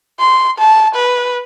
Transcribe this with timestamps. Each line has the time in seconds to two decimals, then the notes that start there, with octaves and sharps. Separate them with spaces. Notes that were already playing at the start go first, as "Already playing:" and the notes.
0.19 C6
0.59 A5
0.95 B4